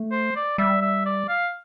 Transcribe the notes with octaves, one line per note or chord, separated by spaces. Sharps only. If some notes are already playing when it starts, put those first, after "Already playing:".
Already playing: A3
C5
D5
G3 E5
E5
D5
F5